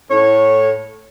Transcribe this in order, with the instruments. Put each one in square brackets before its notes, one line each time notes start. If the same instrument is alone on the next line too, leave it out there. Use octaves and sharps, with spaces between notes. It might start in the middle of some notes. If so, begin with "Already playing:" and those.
[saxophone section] A2 C#5